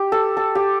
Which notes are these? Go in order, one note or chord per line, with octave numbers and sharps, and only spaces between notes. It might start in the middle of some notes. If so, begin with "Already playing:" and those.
Already playing: G4
A4
A4
G4